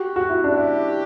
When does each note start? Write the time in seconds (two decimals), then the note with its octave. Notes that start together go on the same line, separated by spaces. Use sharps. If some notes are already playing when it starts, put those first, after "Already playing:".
Already playing: F#4 G4
0.16 F#4
0.29 E4
0.44 D4 G4
0.57 E4